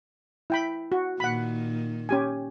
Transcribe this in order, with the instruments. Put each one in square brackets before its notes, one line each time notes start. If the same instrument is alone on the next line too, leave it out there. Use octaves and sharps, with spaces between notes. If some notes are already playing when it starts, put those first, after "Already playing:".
[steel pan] E4 G5 B5
F#4
[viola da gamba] A#2 D#3 [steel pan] F#5 B5
[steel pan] C#4 G4 G#5